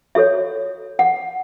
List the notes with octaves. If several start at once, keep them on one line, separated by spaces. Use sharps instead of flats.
F#4 A4 C#5 E5
F#5